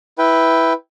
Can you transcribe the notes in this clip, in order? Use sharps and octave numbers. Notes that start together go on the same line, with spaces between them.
E4 B4 G5